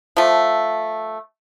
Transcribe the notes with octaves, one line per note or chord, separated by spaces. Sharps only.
F3 A3